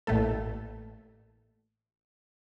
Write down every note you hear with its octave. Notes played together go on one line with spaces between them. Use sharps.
A1 A2 A3 A#3 A4